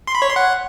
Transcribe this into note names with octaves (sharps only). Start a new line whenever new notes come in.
C6
B5
C#5
C6
F#5